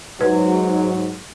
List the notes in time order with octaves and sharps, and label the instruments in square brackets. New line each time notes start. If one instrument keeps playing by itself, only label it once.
[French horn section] G#2 F#3 [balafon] B4